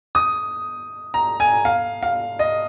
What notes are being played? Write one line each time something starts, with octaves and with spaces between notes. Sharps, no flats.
D#6
A#5
G#5
F5
F5
D#5